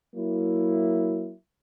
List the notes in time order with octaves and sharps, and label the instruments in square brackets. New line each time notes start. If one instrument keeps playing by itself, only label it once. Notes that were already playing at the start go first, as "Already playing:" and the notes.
[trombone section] F#3 A#3 E4